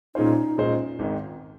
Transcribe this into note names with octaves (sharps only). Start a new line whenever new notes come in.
A#2 G#3 C#4 D#4 F4 C5
A#2 G#3 C#4 F4 C5
G#1 G#2 D#3